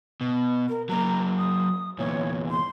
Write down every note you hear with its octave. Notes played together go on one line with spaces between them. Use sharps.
B2
A#4
F#3 A#3 A#5
D#6
E2 A#2 C#5
C6